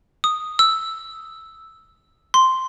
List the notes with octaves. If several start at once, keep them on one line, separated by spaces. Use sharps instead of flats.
D#6
E6
C6